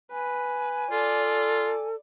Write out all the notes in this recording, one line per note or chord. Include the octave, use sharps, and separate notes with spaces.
B4 G#5
F4 A4 D5